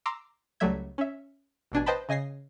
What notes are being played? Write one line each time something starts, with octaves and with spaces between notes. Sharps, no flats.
A#5 C6 D6 E6
C#2 F#3 G3 A3 E5 G#6
C#4 E5
A1 B2 D4 G#5
B4 C5 D#5 G5 A5 B5
C#3 D#5 G#5 A#6 C7